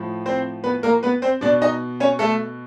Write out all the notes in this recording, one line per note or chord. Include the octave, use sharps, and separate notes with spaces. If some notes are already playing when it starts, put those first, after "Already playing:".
Already playing: A2 F3
C4 C5
B3 B4
A#3 A#4
B3 B4
C4 C5
B2 D4 D5
D#4 D#5
C#4 C#5
A3 A4